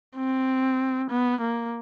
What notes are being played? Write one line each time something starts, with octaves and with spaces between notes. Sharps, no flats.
C4
B3
A#3